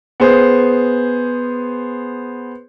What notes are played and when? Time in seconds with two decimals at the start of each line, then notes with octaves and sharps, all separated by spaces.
0.20 B3 G#4 C5